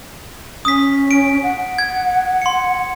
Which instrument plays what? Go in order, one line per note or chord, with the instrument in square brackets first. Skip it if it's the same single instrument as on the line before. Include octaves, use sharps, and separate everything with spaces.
[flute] C#4 [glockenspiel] D#6 B6
[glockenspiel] D7
[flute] F#5
[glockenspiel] G#6
C6 C#7